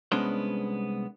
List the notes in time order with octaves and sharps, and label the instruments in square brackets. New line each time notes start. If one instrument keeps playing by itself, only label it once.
[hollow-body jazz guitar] C2 G#3 B3 C#4 D4 C5